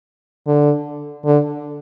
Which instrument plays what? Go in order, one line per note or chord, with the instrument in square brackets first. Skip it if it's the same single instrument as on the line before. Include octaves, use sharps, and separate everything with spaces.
[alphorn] D3
D3